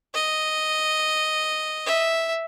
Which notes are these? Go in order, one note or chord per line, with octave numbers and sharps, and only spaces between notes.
D#5
E5